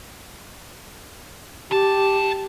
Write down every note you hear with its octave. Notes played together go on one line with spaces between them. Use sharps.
C#3 G4 A5